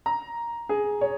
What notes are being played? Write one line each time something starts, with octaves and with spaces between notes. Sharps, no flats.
A#5
G#4
C#5